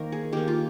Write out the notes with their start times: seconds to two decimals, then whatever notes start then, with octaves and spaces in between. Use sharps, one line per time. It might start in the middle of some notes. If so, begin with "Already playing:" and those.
Already playing: D#3 A#3 A#4 C5
0.12 G#4
0.33 D#3 A#3 G4
0.48 F4